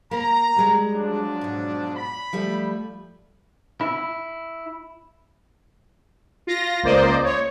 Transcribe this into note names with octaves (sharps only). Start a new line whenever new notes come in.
A#3 A#5
G3 G#3
F3 F#3 D4
G#2 B2
B5
F3 G3 A3
E4
F4 A#6
C#2 A#3 C5 D5 D#5
C#5